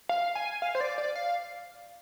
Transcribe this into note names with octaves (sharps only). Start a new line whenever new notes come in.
F5
G#5
F5
C5
D5
D5
F5